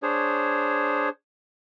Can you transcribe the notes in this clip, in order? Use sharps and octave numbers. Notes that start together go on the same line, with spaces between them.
D4 G#4 C5 C#5